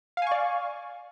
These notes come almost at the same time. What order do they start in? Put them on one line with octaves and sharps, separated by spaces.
F5 G#5 C#6 D5